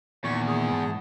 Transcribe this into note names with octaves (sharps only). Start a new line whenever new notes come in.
E2 A#2 D#3 C#6
G#4
G#2 A5